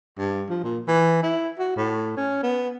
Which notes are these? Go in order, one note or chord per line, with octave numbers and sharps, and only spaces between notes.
G2
F3
A#2
E3
E4
F#4
A2
C#4
B3